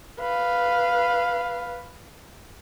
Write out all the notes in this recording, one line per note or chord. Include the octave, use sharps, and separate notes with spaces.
B4 F5